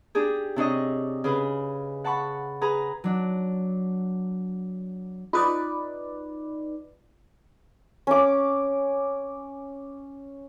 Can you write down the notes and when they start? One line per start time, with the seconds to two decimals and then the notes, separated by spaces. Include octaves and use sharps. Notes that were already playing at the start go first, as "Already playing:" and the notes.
0.15 D4 G4 G#4
0.56 C3 D4 C#5 D#5
1.24 C#3 G#4 B4
2.04 F#5 A5 B5 C#6
2.61 G#4 B4 A#5
3.04 F#3 D4
5.33 D#4 F4 B4 D5 D#6
8.07 C#4 D6